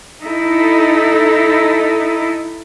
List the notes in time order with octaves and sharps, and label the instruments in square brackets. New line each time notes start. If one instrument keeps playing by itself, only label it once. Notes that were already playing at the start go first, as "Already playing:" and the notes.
[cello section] D#4 E4 A4